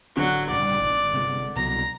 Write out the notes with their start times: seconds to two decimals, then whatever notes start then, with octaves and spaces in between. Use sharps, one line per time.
0.17 D1 D3 F#3
0.51 A#1 G#2 C#3 G3 D5
0.81 G1
1.14 C3 G#3
1.56 C2 B2 F#3 A#5